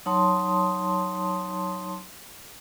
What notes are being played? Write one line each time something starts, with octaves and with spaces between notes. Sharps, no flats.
F#3 D#4 C#5 A5 C6 D#6